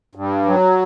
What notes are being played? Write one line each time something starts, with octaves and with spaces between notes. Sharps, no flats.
G2
F#3